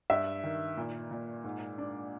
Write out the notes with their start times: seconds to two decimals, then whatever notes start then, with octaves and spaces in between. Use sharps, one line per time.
0.10 G2 E5
0.44 D#3
0.77 A#2
1.11 A#2
1.44 G#2
1.78 D4